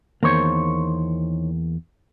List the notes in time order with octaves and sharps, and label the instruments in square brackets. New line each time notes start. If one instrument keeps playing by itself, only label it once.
[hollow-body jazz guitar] E2 A#3 [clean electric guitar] D#3 C5 C#5